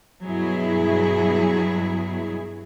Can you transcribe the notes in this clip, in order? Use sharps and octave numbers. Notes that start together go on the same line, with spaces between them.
G2 B2 F#3 E4 G#4